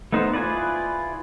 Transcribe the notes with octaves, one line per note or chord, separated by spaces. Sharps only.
A3 B3 D#4 C5
E4 F4 G#4 B4 D5